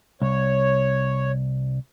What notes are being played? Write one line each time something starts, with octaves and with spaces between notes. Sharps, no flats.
C2 C#5